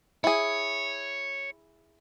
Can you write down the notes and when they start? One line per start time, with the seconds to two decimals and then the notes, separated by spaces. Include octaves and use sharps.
0.24 E4 G#4 C#5